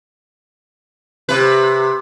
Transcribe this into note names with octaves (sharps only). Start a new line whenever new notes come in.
C3 B4